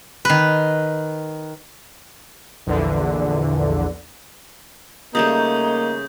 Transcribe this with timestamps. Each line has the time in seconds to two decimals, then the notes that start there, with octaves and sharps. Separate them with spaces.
0.25 D#3 B4
2.66 A#1 E2 D3
5.15 C#3 G3 A3 A#3 D#4 D#6 G6